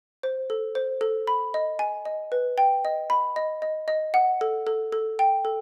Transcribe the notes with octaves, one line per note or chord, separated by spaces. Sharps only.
C5
A4
C5
A4
B5
D#5
G#5
D#5
B4
G5
D#5
B5
D#5
D#5
D#5
F#5
A4
A4
A4
G5
A4